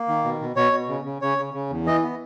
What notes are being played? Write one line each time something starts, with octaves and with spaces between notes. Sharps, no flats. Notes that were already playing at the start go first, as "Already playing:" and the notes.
Already playing: A#3
D#3
B2
B2
B2 C#5
B2
C#3
C#3
C#3 C#5
C#3
C#3
E2
E3 D#5
B3